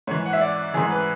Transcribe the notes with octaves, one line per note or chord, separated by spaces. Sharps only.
G#2 E3 C#5
F#5
E5
D5
G#2 E3 G#4
B4